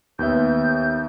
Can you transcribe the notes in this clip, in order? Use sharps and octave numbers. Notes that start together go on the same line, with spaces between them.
D#2 B3 E5 G6